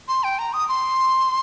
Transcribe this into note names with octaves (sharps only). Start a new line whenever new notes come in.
C6
G5
A#5
D#6
C6